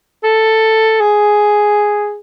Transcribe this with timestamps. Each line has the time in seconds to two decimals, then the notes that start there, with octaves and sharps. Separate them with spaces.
0.24 A4
1.00 G#4